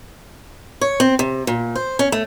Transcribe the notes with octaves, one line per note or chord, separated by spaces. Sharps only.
C#5
C4
C3
A#2
C5
C#4
A3